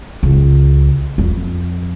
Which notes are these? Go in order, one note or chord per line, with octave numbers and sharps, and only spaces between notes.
C#2
F2